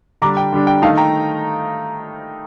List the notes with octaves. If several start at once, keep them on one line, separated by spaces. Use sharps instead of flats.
D3 G3 D4 A#5 D6
G5
D3 G3 D4
G5
D#3 A3 D#4 F5 A5
G5 A#5